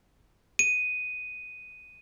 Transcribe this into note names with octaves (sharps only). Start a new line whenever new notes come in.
D#7